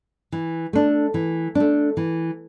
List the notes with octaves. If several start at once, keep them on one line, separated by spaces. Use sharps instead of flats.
E3
A3 D4
E3
A3 D4
E3